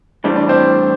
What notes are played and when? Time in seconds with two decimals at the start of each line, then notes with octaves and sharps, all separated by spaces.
0.24 A2 E3 G3 D4 C5
0.36 D5
0.49 C4 C5